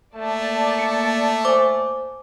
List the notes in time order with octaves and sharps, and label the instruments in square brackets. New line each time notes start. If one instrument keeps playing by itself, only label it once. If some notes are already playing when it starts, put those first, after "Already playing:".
[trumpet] A3 [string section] A#3 D5 A5
[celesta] C#7
[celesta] C5 G#5 [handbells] D6